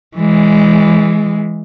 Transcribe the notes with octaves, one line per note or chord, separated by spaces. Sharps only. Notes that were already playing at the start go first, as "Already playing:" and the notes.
E3 G#3